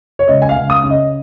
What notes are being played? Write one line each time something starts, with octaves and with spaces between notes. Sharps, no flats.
C#5
C#2 D#5
G#5
F5
C#2
D#6
C#3
D#5